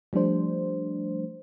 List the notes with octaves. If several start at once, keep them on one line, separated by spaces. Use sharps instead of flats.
F3 G3 A3 D4 C5